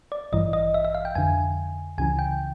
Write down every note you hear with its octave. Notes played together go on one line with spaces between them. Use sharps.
D5
A1 G2 E3 D#5
D#5
E5
E5
F5
G5
F2 D3 G#5
C#2 C#3 E3 G#5
G5